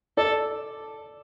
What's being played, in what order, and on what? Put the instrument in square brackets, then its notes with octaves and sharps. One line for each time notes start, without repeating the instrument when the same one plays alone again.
[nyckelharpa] A4 [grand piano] D5